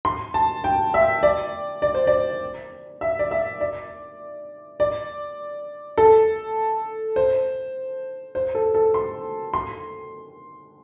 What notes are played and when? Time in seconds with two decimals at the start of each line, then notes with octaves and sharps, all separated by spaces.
0.05 C6
0.34 A5
0.64 G5
0.94 E5
1.23 D5
1.82 D5
1.95 C5
2.07 D5
3.01 E5
3.19 D5
3.31 E5
3.61 D5
4.80 D5
5.98 A4
7.16 C5
8.35 C5
8.55 A4
8.74 A4
8.94 C6
9.54 C6